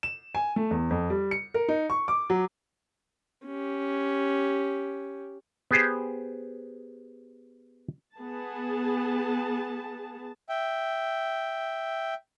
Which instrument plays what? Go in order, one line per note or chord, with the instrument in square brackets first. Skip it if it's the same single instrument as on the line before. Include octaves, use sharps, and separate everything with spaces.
[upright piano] E7
G#5
A3
E2
F2
G3
C#7
A#4
D#4
C#6
D6
F#3
[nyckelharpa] C#4 G4
[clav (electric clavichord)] B3 G4 G#4 C5
[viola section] B3 G#4 A5
[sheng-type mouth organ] E5 G5